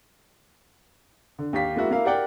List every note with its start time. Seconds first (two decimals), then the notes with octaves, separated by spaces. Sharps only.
1.39 D3
1.53 D#2 G4 F5 B6
1.76 G#3 A#3 E4 F#4
1.91 A#3 E4 F5
2.05 G4 A#4 D5 F#5 G5